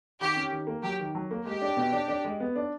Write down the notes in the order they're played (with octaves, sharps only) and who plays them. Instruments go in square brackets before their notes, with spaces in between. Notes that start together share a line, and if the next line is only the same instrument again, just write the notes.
[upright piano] D#3 [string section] G4
[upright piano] C#4
D#3
A#3
[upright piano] F#3 [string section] G4
[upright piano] D#3
F#3
A#3
[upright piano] G#3 [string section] G4
[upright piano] D4
B2
D4
D4
G#3
B3
D4